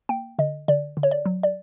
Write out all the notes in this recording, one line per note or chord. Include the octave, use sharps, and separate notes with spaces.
A#3 G5
D3 D#5
D3 D5
D3
C#5
D5
F#3
D5